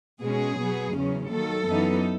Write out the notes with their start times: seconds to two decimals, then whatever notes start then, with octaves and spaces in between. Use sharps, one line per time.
0.22 B2 G#3 C#4 G#4
0.57 B2 F#3 B3
0.93 E2 C#3 F#3 C#4
1.29 D#2 D#3 F#3 A4
1.65 F#2 E3 B3 D#4